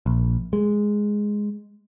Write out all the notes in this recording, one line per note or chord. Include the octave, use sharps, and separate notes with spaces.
A#1
G#3